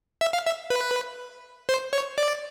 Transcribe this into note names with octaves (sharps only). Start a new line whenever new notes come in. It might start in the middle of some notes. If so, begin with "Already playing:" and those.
E5
F5
E5
B4
C5
C#5
D5